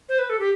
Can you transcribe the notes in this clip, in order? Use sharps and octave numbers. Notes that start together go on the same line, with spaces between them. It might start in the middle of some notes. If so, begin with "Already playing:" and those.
C5
B4
A4
G4